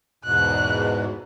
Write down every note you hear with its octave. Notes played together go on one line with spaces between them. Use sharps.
E2 G#2 B2 F#6